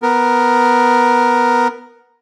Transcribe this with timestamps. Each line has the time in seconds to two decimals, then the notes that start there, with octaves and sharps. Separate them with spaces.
0.02 B3 A#4